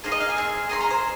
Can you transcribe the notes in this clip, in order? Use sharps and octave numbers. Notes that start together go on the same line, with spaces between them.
A#3 D#4 G#4 C5
D#5
F5
G#5
C4 G#4
A#3 D#4 G#4 C6
A#5
C5